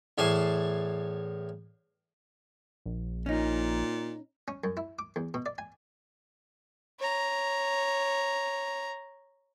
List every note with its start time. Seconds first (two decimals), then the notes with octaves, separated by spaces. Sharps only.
0.18 E2 A2 G#5 A5 C6
2.86 A#1
3.26 A#2 C#4 D#4
4.48 C#4
4.64 F#2
4.77 E4
4.99 D6
5.16 E2
5.34 B2
5.46 D5
5.58 G#5
7.00 C#5 A#5